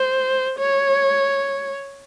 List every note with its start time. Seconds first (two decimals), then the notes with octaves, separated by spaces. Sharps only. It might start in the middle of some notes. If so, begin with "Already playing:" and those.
Already playing: C5
0.59 C#5